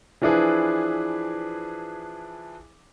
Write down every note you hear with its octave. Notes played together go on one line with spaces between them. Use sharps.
E3 F3 D4 E4 G#4 B4